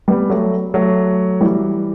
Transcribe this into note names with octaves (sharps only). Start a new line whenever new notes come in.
G3 B3
F#3 A3
F#3 A3
E3 G3